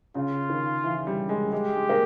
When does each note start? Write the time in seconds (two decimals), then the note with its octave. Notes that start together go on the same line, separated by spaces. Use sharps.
0.15 C#3 F4
0.50 D#3
0.84 E3
1.07 G3
1.29 G#3
1.52 G#3 G4
1.75 G#3
1.89 A#3